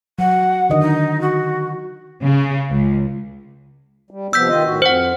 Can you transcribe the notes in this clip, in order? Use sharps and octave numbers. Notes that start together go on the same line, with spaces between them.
F#3 F#5
D3 D#3 D#5
D#4
F#4
C#3
C#2
G3
C3 F3 B3 E6 G6 B6
D#3 F4 D#5
A2 D#3 F#4
F2 C5 F#5